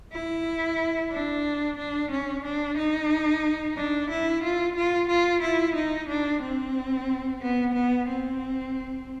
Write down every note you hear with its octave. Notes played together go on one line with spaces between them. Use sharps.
E4
D4
D4
C#4
D4
D#4
D4
E4
F4
F4
F4
E4
D#4
D4
C4
B3
B3
C4